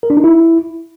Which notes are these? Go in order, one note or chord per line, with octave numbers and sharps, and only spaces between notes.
A#4
D4
D#4
E4